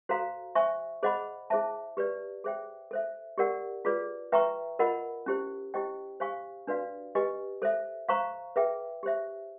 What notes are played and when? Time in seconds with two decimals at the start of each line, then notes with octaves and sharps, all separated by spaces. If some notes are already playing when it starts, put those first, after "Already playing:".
0.09 F#4 A4 C5 F5 A#5
0.55 C5 E5 G#5 C#6
1.03 G#4 C5 D#5 F#5 B5
1.50 E4 G#4 C5 E5 A5
1.97 G4 B4 D5
2.44 G#4 C5 E5 G5
2.91 A4 C5 E5
3.38 G4 A#4 D5 F#5
3.85 F4 G#4 B4 D5
4.32 B4 E5 G5 A#5 C#6
4.79 F4 A#4 D#5 F#5 B5
5.26 C#4 E4 G4 C5
5.74 E4 G4 C5 D#5 G5
6.20 G4 C5 F5 G#5 C#6
6.67 D4 F#4 B4 D5 F5
7.15 G4 B4 D#5 G#5
7.62 A4 C5 E5
8.09 C5 F5 A#5 C#6
8.56 G#4 B4 E5 G5
9.03 G4 C5 E5